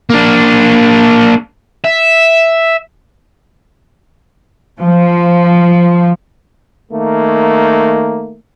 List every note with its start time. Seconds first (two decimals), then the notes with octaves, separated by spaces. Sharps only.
0.10 A#3 D4
1.84 E5
4.81 F3
6.92 D#3 A3 A#3